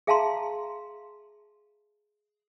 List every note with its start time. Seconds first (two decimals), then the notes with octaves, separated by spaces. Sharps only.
0.07 G#4 E5 F5 A5 A#5 C6